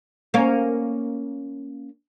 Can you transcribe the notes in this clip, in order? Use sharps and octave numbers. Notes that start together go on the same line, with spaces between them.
A#3 C#4